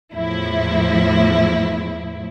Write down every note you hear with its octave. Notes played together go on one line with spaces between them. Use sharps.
E2 A2 F3 E4